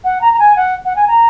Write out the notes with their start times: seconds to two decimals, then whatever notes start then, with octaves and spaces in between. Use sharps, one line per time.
0.04 F#5
0.21 A#5
0.33 A#5
0.39 G#5
0.56 F#5
0.85 F#5
0.96 G#5
1.08 A#5